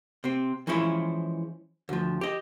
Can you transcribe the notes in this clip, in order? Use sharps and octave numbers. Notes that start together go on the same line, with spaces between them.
C3 C4
E3 F3 G#3 C#4 E4
D2 F3
G4 D#5